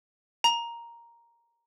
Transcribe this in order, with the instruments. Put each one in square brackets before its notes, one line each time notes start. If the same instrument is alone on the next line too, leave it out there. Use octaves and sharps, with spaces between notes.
[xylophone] A#5